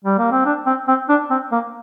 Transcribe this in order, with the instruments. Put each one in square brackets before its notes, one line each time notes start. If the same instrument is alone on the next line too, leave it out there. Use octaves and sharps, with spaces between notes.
[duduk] G3
A#3
C4
D4
C4
C4
D4
C4
A#3